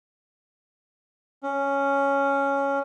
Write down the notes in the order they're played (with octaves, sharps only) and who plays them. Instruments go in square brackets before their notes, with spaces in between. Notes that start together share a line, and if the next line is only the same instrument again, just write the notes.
[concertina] C#4